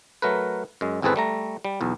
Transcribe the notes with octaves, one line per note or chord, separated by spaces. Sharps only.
F#3 A3 A#4 B4
F#2 G#3
G#1 E2 C4 G#4 A4 B4
G3 A3 A#5
G3
B1 E2